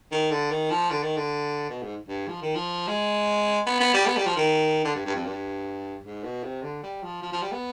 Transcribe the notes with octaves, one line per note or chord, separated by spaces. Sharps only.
D#3
D3
D#3
F3
D3
D#3
D3
B2
G#2
G2
F3
D#3
F3
G#3
B3
B3
G3
B3
G3
F3
D#3
D3
G2
G2
F2
G2
G#2
B2
C3
D3
G3
F3
F3
F3
G3
B3